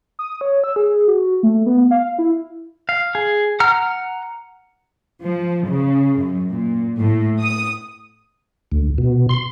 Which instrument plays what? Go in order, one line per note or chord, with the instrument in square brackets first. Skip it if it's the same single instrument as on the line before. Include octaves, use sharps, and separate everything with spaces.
[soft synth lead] D#6
C#5
E6
G#4
F#4
A3
B3
F5
E4
[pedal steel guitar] F5
G#4
F#5 A#5 F6
[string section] F3
C#3
F#2
A#2
A2
D#6
[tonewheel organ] D2
B2
C6